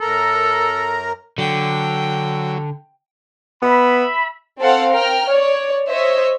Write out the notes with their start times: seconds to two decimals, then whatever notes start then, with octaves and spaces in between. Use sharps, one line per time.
0.01 F#2 A4 A#4 A#5
1.38 D3 F#3 G5
3.62 B3 E5 B5
4.60 C4 A4 F5 F#5
4.92 A#4 G5 F6
5.29 C#5 D5
5.89 C5 C#5 D#5 E5